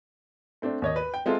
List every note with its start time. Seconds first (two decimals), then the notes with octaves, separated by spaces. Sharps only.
0.62 A3 C4 D4
0.82 D#2 C#5 D#5
0.96 B4
1.14 G5
1.26 G#3 C4 F4 A4 E5